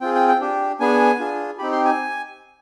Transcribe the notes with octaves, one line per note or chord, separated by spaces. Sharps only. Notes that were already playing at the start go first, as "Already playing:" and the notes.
C4 F4 G#4 G5
G5
G5
D4 G4
B3 D4 G#4 G#5
D4 F4 G#4
C4 D#4 G4 B5
C6
G#5